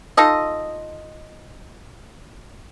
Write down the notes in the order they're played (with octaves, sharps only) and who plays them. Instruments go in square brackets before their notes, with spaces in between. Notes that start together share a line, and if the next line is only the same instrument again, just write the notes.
[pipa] D#4 F4 A4 D#5